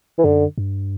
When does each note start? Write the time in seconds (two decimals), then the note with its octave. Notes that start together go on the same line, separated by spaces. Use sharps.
0.18 E3
0.24 F#2 D3
0.58 G2